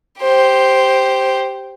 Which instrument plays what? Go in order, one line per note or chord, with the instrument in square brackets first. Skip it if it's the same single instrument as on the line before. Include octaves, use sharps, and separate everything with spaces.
[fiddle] G4 C5